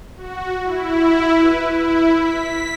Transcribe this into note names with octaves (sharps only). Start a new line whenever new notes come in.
F#4
E4
B4
E4
B6